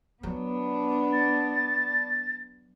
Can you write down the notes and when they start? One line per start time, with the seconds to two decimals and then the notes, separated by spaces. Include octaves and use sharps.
0.23 F#3 B3 D4
1.13 A6